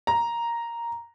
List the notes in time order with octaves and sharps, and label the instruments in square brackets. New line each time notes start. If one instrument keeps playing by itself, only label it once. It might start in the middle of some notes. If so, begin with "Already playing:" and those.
[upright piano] A#5